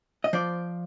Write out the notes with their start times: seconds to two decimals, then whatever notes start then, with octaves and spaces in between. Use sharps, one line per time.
0.24 D#5
0.33 F3 C5 D5